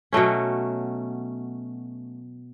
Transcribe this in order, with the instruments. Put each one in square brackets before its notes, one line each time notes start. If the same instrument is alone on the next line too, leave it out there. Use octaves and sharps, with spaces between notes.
[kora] B2 F#3 A3 C#4